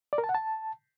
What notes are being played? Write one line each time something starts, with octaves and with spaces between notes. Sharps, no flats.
D5
A#4
A5
F#5
A5